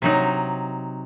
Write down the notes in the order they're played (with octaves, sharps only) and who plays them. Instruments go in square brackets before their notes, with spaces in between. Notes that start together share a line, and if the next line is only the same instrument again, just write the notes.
[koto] C3 F#3 D#4